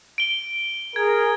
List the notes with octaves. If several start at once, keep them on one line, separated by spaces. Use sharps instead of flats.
D7 G7
G#4 A#4 G#6